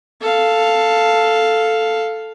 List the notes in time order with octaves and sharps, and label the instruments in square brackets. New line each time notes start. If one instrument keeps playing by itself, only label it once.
[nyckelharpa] A4 F5